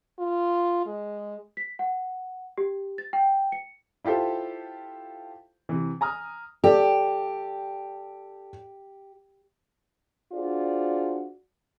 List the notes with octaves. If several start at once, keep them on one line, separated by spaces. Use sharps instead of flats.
F4
G#3
B6
F#5
G4
A6
G5
C#7
E4 F4 G4 A4 C5
C3 E3
G#5 A#5 D#6 F6
G4 A4 D5 G5
D4 F4 F#4 G#4 C5 D5